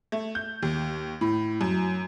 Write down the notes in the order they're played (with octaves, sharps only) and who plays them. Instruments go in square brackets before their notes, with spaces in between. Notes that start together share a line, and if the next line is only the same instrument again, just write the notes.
[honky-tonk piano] A3
G6
D#2
A2
F#2